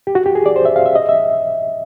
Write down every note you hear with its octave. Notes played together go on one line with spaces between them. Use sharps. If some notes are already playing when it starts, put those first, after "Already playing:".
G4
F#4
G4
G#4
D5
C5
E5
F5
E5
D#5
E5